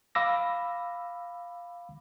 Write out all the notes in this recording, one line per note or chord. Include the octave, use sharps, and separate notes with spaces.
F5 B5 D6 E6 A#6